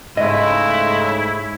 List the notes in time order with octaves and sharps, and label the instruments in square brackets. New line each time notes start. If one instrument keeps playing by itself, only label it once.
[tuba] G#2 [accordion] C#3 G#3 A3 [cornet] E4 [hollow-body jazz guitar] D#5